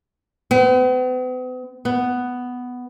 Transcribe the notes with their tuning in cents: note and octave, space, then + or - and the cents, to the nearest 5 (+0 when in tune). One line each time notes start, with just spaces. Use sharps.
B3 +45
B3 +5